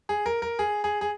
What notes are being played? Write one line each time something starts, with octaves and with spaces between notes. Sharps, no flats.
G#4
A#4
A#4
G#4
G#4
G#4